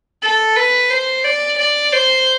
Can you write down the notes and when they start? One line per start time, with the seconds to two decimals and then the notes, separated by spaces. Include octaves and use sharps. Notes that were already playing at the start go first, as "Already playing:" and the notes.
0.23 A4
0.56 B4
0.90 C5
1.24 D5
1.57 D5
1.92 C5